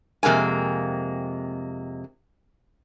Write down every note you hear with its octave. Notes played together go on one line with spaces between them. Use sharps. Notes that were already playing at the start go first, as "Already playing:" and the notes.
F2 C3 G#3 A#3 G#5